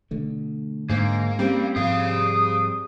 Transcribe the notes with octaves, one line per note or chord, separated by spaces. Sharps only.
B2 D3 A3
G#2 D3 A#3
G3 C4 C#4
G#2 F3 G#4 F5 D#6